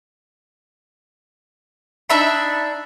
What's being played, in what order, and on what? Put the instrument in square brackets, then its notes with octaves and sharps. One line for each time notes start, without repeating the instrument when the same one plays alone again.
[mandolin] D4 D#4 E5 B5